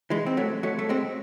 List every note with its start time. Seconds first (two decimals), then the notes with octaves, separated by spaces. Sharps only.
0.10 E3 G#3
0.26 C4
0.37 F#3 A3
0.63 F#3 A3
0.79 A3
0.89 G#3 C4